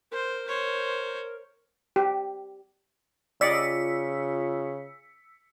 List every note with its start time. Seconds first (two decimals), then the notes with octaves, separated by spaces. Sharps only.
0.12 A#4 C5
0.48 C5 C#5
1.96 G4
3.41 C#3 F4 D5 D#5 E6 B6 C#7